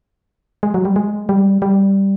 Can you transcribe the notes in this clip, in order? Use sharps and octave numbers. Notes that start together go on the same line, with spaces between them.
G#3
F#3
G3
G#3
G3
G3